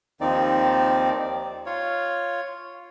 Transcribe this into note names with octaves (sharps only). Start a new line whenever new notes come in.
D#2 D#3 F3 C4 D#4 D5
F4 C#5